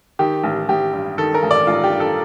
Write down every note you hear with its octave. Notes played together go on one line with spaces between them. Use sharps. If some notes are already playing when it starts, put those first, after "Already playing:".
D#3 G4
A1
A1 G4
G2
D#3 A4
A#4
A1
D5
A1 F4
G4
G2
A4